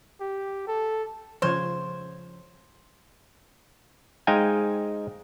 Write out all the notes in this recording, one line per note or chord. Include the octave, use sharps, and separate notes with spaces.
G4
A4
C#3 F3 C5 C#5
G#3 D#4 C5 F5 G5 G#5